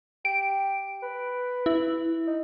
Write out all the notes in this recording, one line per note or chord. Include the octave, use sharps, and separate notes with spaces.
G4 D7
B4
E4
D#4